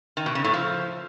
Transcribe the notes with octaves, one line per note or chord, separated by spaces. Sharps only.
D#3
B2
C#3
A2
F3